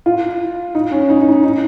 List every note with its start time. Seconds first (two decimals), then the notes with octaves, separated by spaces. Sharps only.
0.06 F4
0.75 D#4
0.91 C#4
1.10 D#4
1.21 D#4
1.32 D#4
1.44 D#4